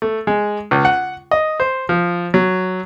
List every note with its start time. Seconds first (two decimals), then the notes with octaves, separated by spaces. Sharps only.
0.02 A3
0.27 G#3
0.71 C#2
0.85 F#5
1.31 D#5
1.60 C5
1.89 F3
2.34 F#3